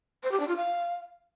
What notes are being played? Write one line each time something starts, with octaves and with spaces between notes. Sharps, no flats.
C5
G4
D4
F4
F5